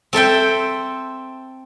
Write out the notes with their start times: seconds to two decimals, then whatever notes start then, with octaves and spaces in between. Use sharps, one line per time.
0.13 C4 A4 E5 G5